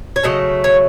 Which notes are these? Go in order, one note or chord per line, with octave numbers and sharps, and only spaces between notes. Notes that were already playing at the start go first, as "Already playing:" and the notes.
C#5
C#3 F#3 A3 D#5
C#5